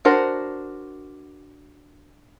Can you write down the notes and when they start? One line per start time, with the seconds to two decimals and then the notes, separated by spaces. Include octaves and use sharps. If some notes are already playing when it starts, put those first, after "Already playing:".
0.05 D4 F#4 A#4 C5